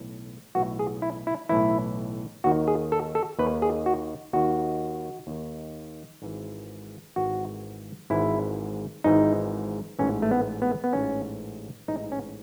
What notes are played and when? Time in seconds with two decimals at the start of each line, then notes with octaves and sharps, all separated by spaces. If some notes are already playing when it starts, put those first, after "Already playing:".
Already playing: B1 A2 E3
0.55 B1 A2 E3 F#4
0.79 G#4
1.02 E4
1.27 E4
1.49 B1 A2 E3 E4
2.44 D#2 D#3 F#4
2.68 G#4
2.92 A4
3.15 A4
3.39 D#2 D#3 B4
3.62 G#4
3.86 F#4
4.33 D#2 D#3 F#4
5.27 D#2 D#3
6.22 G#1 G#2 E3
7.16 G#1 G#2 E3 F#4
8.10 G#1 G#2 E3 E4
9.04 G#1 G#2 E3 D#4
9.99 A1 G#2 E3 C#4
10.22 A3
10.31 B3
10.62 B3
10.84 B3
10.93 A1 G#2 E3 C#4
11.88 A1 G#2 E3 D#4
12.12 C#4